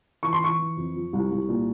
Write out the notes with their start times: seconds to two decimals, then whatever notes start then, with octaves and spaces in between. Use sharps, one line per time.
0.23 E3 C#6
0.33 C6
0.41 E3 C#6
0.59 E3
0.77 F2
0.96 F3
1.13 C2
1.31 C2
1.49 A#2